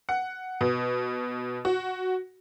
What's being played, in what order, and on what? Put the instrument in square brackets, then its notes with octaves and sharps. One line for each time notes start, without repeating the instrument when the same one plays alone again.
[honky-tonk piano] F#5
B2
F#4